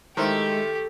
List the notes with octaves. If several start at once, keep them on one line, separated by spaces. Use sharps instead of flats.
D#3 G#3 A3 E4 G4 C5